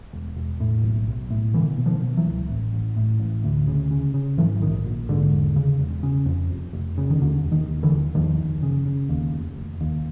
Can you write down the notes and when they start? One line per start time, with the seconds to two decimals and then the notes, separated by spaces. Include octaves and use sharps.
0.13 E1
0.36 E1
0.60 A2
0.84 B1
1.07 B1
1.31 A2
1.54 B2 D3 E3
1.78 B2
1.86 D#3 F3
2.02 B2
2.17 E3 F#3
2.26 C#2
2.49 A1
2.73 A1
2.96 A2
3.20 A1
3.44 D2
3.67 C#3
3.91 C#3
4.14 C#3
4.37 G#2 E3 F#3
4.61 A#1 D#3
4.85 A#1
5.09 G#2 D3
5.31 E1
5.56 C#3
5.79 E1
6.03 C#3
6.26 F2
6.51 F1
6.73 F1
6.98 C#3
7.10 D#3
7.21 D#2 D3
7.44 E1
7.52 D#3
7.68 D#2
7.83 D3 E3
7.91 D#2
8.15 E2 D#3 F3
8.39 F#1
8.63 C#3
8.86 C#3
9.09 D#2
9.34 F1
9.56 F1
9.81 D#2